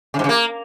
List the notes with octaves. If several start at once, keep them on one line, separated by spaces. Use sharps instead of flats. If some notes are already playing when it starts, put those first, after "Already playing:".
C#3
G#2
C#3
A#3